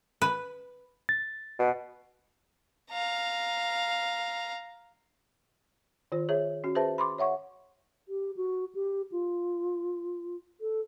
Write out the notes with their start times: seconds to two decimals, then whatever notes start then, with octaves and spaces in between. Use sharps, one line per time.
0.22 B4
1.09 A6
1.59 B2
2.91 F5 A#5
6.12 D#3 F4 C5
6.29 G#4 C#5 E5
6.64 C#4 F#4
6.75 G#4 B4 C5 E5 A5
6.98 B5 C6 D6
7.18 C#5 E5 F#5 C#6
8.08 G4
8.36 F#4
8.75 G4
9.12 F4
10.61 A4